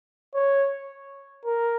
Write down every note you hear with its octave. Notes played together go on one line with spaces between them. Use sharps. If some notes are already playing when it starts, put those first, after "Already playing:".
C#5
A#4